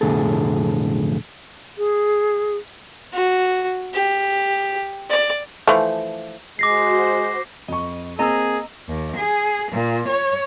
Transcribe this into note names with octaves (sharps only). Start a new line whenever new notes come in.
B1 F2 A2 D3 G#4 A4
G#4
F#4
G4
D5
E3 F3 A3
G#3 F#4 C5 D6 A#6 C7
F2 D#5 C#6
A#3 C4 G#4 D#5 A#5 E6
D#2
G#4
A#2
C#5